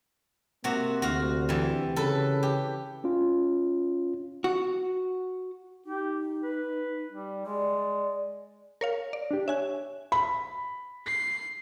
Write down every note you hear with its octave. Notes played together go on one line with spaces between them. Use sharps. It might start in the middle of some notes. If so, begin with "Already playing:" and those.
C3 A#3 F#4 F#5
D2 F#4 F5
E3 G3
C#3 A4 B4
G4
C#4 F4
F#4
D#4 G4
B4
G3
G#3 D5
A#4 C#5 F5
D5
D4 G4
C#5 E5 G#5 F#6
B5
C7